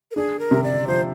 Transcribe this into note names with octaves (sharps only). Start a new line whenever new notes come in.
A#4
D4 G#4
A#4
C3
D5
F3 C5